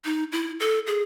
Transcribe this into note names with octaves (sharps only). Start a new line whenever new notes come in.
D#4
E4
A4
G#4